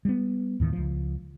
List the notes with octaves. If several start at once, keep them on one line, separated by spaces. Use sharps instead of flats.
G3 B3
D#2 A2 D#3 E3
C#2 F3